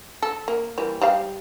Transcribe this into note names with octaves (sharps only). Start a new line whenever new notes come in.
A4
A#3
E3 G3 A#3
G3 G4 F5